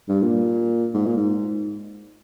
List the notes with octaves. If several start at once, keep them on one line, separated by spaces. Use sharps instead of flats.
G2
A#2
G#2
A#2
G#2